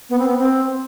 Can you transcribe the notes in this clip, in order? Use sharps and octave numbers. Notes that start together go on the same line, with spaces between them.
B3
C4
B3
C4